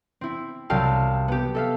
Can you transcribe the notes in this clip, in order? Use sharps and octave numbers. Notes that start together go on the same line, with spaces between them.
C4 E4
C2 F#3 F5 G5 A5 E6
B3 G4
A4 E5 F5